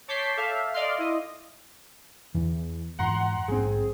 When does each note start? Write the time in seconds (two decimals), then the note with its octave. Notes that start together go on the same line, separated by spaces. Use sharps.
0.08 C#5 A5 D6 G6 B6 C7
0.37 A4 E5 F5
0.74 D5 D#5 F5 C6
0.98 E4 D#5
2.34 E2 E3
2.99 F2 G#2 E3 F#5 A#5 C6
3.48 A#1 G#2 F#3 C4 G#4